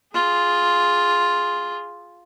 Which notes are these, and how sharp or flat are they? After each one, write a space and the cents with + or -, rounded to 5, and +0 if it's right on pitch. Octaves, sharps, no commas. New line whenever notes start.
F4 +0 G#4 +0